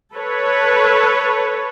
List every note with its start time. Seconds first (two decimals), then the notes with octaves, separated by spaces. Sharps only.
0.15 A4 B4 C#5